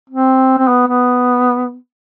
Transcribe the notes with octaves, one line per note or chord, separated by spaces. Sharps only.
C4
C4
B3
B3